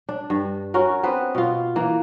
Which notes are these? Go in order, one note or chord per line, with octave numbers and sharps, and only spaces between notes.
D4
G2
C#4 F#4 A#4
B3 C4 B4
B2 F4
E3 A#3